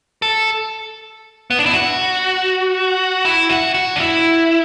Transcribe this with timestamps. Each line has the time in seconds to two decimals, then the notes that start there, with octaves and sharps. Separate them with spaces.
0.22 A4
1.50 B3
1.59 D4
1.66 E4
1.73 F#4
3.25 E4
3.49 F#4
3.74 F#4
3.96 D4
4.00 E4